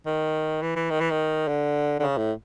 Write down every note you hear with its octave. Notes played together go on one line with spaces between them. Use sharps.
D#3
E3
E3
D#3
E3
D#3
D3
D3
C#3
A2